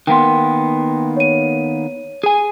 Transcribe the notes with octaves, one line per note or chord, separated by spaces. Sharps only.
D#3 A#3 B3 G5 C6
C#5 D#7
G#4 G#5